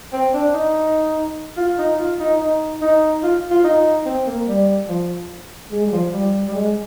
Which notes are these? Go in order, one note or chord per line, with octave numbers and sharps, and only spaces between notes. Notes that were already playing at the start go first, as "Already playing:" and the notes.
C4
D4
D#4
F4
D#4
F4
D#4
D#4
D#4
F4
F4
D#4
C4
A#3
G3
F3
G#3
G3
F3
G3
G3
G#3